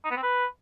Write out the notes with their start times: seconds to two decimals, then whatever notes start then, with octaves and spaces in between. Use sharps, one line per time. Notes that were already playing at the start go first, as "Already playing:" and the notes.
0.05 D#4
0.11 B3
0.17 C4
0.23 B4